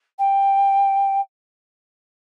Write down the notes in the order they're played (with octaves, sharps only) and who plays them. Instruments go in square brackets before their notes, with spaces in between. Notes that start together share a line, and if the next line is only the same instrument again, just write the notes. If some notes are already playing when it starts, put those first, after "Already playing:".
[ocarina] G5